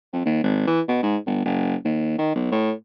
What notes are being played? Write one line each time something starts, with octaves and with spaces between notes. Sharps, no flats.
F2
D#2
G#1
E3
B2
G#2
G1
F#1
D#2
D#3
B1
A2